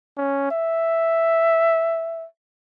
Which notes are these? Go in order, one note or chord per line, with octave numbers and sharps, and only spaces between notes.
C#4
E5